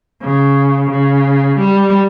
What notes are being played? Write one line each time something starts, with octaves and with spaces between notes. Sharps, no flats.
C#3
C#3
G3